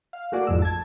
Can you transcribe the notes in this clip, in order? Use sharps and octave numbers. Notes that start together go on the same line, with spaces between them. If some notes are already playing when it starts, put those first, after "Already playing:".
F5
A3 A#3 F#4 G#4 D5
A1 F2 G#2 E6
A5 G#6